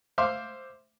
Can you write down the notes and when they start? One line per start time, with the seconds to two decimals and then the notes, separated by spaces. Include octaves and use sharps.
0.18 C5 E5 F5 C6 D6